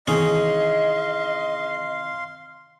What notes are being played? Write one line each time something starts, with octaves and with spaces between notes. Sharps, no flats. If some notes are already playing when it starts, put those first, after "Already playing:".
C3 D#3 E3 C#4 G#4 D#5 F5 C6